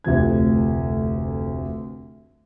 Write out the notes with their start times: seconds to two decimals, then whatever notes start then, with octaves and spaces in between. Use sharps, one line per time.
0.04 F1 D2 C3 F3 G#6